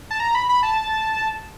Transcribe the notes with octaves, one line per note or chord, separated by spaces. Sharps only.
A5
A#5
B5
B5
A5